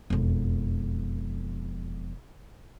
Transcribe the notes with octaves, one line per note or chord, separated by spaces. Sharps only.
E1 F2